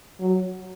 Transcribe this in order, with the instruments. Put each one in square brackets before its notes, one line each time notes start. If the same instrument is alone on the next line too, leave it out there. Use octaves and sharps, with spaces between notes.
[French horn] F#3